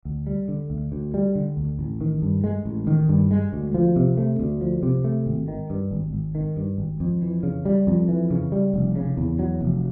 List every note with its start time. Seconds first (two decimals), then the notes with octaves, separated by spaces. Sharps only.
0.05 D2
0.27 G3
0.48 D3
0.70 D2
0.92 D2
1.14 G3
1.35 D3
1.57 D2
1.79 A1
2.01 D#3
2.22 G2
2.44 G#3
2.65 A1
2.87 D#3
3.09 G2
3.31 G#3
3.53 D2
3.74 F3
3.96 C3
4.17 A3
4.40 D2
4.61 F3
4.83 C3
5.04 A3
5.26 G#1
5.48 D#3
5.70 G2
5.91 G#1
6.13 G#1
6.35 D#3
6.57 G2
6.78 G#1
7.00 F2
7.22 E3
7.43 C#3
7.65 G3
7.87 F2
8.08 E3
8.30 C#3
8.52 G3
8.74 F1
8.96 C#3
9.17 E2
9.39 F#3
9.61 F1